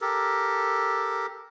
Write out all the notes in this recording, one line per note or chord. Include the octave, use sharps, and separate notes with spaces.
G4 A4 A#4